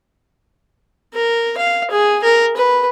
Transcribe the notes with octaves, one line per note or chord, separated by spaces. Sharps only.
A#4
F5
G#4
A#4
B4